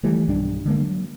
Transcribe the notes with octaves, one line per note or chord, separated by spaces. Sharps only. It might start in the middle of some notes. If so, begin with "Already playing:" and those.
D#3 E3 G3 A3
B1 G2 G3 D4
D3 G#3 A#3
F#3